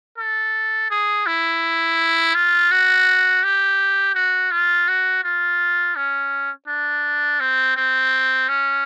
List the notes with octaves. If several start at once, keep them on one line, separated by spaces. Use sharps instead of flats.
A4
G#4
E4
F4
F#4
G4
F#4
F4
F#4
F4
C#4
D4
C4
C4
C#4